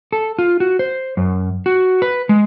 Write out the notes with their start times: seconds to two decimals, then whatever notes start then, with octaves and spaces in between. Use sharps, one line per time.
0.12 A4
0.39 F4
0.60 F#4
0.79 C5
1.17 F#2
1.66 F#4
2.02 B4
2.29 G#3